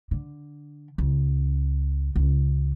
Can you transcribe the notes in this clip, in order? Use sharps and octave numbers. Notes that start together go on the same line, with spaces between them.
D3
C#2
C#2